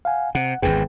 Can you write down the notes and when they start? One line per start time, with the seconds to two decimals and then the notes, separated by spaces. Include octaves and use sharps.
0.05 F5 F#5 G#5
0.35 C3 F#5
0.62 G#1 E2 G#2 G#4 B4 G5